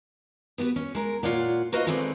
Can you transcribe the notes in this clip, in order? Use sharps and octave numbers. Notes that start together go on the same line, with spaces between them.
B3 F#4 G4 B4
C#4
G#3 A#4
A#2 F4 C#5 D5 F#5
D#4 F#4 B4 C5 D#5 F5
D#3 G#3 A3 C4 B4 D5